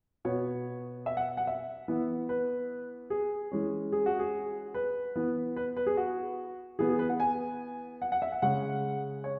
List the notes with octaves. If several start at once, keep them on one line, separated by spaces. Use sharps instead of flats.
B2 B3 C#5
E5
F#5
F#5
E5
E3 B3
B4
G#4
E3 G#3 C#4
G#4
F#4
G#4
B4
E3 B3
B4
B4
G#4
F#4
E3 B3 G#4
G#4
B4
F#5
G#5
F#5
F#5
E5
F#5
C#3 G#3 C#4 F#5
C#5